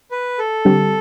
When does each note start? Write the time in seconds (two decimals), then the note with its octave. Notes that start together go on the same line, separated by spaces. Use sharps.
0.11 B4
0.39 A4
0.65 D3 G3 C4 G4